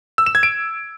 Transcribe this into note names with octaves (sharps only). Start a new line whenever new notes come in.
E6
E7
G#6
D7